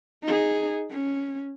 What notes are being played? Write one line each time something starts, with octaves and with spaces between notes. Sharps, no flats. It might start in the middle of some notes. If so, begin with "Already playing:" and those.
D#4 G#4
C#4